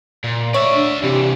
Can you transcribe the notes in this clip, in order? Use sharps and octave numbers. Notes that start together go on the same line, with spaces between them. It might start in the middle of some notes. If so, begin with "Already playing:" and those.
A#2
C#5 D5 E5
D4
C3 E3 G4